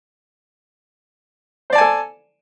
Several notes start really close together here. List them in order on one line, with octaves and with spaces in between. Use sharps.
C5 D5 A5 G#5 A4